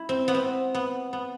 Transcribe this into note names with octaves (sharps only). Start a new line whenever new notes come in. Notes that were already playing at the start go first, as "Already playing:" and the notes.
Already playing: E4
C4
B3
C4
B3
B3